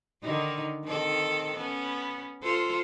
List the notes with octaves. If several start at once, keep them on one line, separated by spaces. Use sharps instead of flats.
D3 D#3 D#4
D#3 C4 A4
B3 C#4
F4 A4 C5